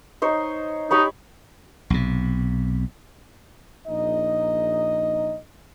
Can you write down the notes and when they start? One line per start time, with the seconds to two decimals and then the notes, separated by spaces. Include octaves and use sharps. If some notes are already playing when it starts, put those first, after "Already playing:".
0.22 D#4 C5 C#5
0.91 D#4 G4 C#5 B5
1.90 B1 C3
3.87 A#1 D#4 D#5